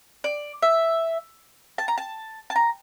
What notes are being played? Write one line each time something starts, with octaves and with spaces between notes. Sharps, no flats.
D5
E5
A5
A#5
A5
A5
A#5